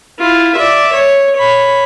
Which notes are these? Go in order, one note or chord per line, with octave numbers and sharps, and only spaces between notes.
E4 F4
D5 E5
C#5
C#5 B5